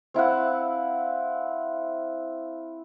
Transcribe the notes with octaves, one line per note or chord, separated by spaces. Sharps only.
C4 E4 F5 F#5